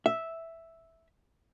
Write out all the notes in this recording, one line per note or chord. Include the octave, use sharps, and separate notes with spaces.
E5